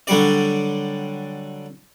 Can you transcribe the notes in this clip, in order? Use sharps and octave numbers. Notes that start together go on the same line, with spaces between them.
D3 F#3 G3 D5